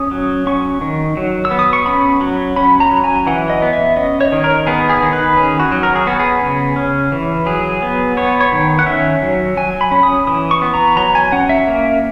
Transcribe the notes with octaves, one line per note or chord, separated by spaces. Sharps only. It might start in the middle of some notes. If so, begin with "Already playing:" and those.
Already playing: C#4 D#6
F#3
C#4 C#6
D#3
F#3
E6
B3
D#6
C#6
C#4 B5
F#3
C#4 B5
A#5
F#3
G#5
E3 F#5
D#5
B3
E5
C#4 D#5
C#5
D#3
A#4
B3 G#4
G#4
D#3
B4
C#4 G#4
F#4
F#3
A#4
G#4
B3 F#4
G#4
C#3
C#4
E3
F#3 G#4
B3
B3 C#5
C#5
D#3
F#5
C#4 E5
F#3
F#3 G#5
B5
C#4
D#6
E3 D#6
C#6
B3
A#5
F#3 A#5
G#5
C#4 F#5
E5
A#3